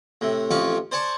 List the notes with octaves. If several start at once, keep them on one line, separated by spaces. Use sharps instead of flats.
A2 C3
A1 F2 F3 F5 C#6 D6
C5 D5 G#5 A5 C#6